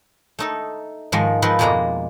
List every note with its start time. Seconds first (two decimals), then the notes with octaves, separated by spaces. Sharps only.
0.39 A3 D#4 A4
1.12 G#2 D#3 F3 G#3
1.42 F3 C4 D#4 A#4 B4
1.59 F2 B2 G#3 A#3 D5 A#5